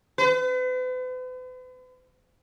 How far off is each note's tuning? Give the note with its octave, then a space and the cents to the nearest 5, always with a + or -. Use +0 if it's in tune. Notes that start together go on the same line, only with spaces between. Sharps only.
B4 +45